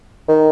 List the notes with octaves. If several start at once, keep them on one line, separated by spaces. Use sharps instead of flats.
D#3